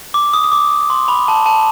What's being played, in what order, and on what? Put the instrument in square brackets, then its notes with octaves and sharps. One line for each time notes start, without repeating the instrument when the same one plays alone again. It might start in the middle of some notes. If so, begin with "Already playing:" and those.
[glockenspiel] D6
D#6
D#6
D6
C6
B5
A5
A5